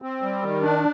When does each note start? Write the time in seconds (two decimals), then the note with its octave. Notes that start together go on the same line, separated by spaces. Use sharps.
0.02 C4
0.22 G3
0.42 D#3
0.62 D4